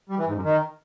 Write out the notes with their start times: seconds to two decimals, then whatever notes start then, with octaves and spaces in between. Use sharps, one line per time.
0.09 G3
0.18 E3
0.27 G#2
0.35 F#2
0.44 D#3